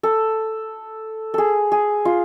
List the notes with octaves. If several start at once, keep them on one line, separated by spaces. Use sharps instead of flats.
A4
G#4 A4
G#4
F4